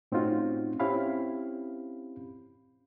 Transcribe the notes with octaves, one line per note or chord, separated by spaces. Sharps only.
A2 C4 C#4 D#4 F4 F#4
C4 C#4 E4 G4 F5 B5